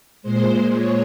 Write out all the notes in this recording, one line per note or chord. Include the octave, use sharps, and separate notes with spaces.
A#2 G#3 C5
C#5